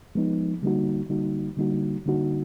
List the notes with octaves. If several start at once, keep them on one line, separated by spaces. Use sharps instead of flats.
F3 G#3 B3 D#4
D3 G3 A#3 D#4 F#4
D3 G3 A#3 D#4 F#4
D3 G3 A#3 D#4 F#4
D3 G3 A#3 D#4 F#4